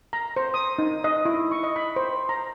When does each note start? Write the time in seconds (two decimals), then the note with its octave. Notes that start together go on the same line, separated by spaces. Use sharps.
0.13 A#5
0.36 C5
0.54 D#6
0.79 D#4
1.04 D#5
1.25 E4
1.51 C#6
1.64 D#5
1.76 B5
1.96 C5
2.29 A#5